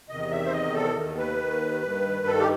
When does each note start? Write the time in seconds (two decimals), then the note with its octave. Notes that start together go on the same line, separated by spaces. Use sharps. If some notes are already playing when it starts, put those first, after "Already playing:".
0.09 E2 C3 D#3 D#5
0.31 E5
0.46 C5
0.52 D#5
0.74 A4
0.97 D#2 D#3
1.18 B4
1.83 G2 D#3
2.26 A4
2.40 G4